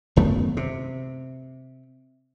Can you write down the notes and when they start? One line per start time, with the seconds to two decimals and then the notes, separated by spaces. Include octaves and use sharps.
0.16 G#1 F#2 A3 B3
0.57 C3